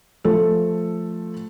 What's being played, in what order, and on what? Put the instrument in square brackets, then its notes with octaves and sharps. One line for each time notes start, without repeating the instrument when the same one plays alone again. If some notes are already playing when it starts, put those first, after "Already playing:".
[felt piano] F3 A3 A4